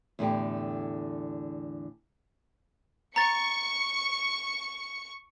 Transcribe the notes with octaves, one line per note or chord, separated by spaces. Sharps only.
E2 A2 D3 G4
A#5 C#6 A6 C#7